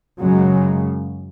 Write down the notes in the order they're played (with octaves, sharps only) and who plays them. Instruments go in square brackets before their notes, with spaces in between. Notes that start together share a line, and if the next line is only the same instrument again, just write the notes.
[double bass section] F#2 C#3 F#3 G#3